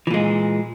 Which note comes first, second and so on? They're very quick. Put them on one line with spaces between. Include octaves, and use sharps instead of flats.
E3 A#2 G#3